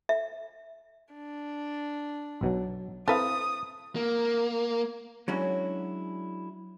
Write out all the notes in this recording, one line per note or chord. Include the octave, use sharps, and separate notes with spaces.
E5
D4
B1 B2 F#3
C4 E4 A4 B4 F5 D#6
A#3
F#3 G#3 C#4 D4 E4 F#4